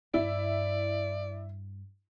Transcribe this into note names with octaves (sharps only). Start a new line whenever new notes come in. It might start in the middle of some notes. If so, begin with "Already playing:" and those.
G2 E4 D5